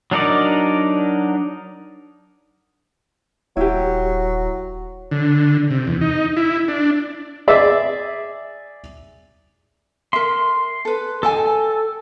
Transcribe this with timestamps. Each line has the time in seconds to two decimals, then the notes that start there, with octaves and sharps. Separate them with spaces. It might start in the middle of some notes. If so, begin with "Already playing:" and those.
0.11 F#3 D4 D#4 A#4 D5
3.57 D#1 F#3 E4 G4
5.11 D3
5.71 C3
5.87 E2
6.01 D#4
6.37 E4
6.68 D4
7.48 G#4 D5 E5
10.13 A#4 E5 C6
10.85 A4 B4
11.23 A4 D#5 G5 G#5